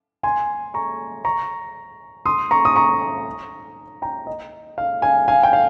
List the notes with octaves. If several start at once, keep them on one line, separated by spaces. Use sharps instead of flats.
G#5 C6
A#5 C#6
A#5 C#6
C6 D#6
A#5 C#6
D#6
A#5 C#6
G5 A#5
D#5
F5
F5 G#5
F5 G#5
G5
F5